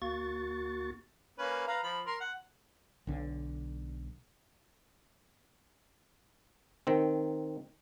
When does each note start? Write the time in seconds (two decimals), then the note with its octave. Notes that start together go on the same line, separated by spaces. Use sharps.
0.02 D2 A#3 F#4 C#6 A6
1.38 A#3 C#4 B4
1.67 B4 F5 A#5
1.83 F3 B5
2.06 A#4 C6
2.20 F#5
3.07 B1 D3
6.87 D#3 C4